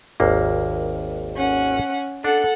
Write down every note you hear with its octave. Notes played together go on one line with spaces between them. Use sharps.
G#1 D#2 A#3
C#4 F#5
D4 A4 F#5